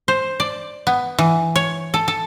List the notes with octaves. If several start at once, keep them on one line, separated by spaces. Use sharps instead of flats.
C5
D5
B3
E3
C#5
A4
A4